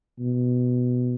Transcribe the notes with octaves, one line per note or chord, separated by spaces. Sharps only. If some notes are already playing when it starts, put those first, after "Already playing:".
B2